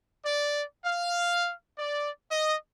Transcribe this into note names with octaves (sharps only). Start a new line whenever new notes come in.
D5
F5
D5
D#5